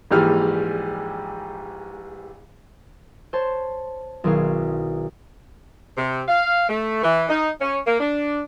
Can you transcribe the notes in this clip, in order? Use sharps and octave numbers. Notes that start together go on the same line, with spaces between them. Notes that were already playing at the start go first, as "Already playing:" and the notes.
A#1 G#2 E3 G3 F6
C5 C#5 A5
B1 D#3 E4 F#4 G#4 F5
C3
F5
A3
E3
D#4
C#4
A#3
D4